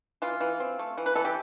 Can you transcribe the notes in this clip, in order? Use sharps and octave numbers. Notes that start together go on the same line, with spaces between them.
E3 F4
E3
C4
A3
E3
B4
E3 A4
G4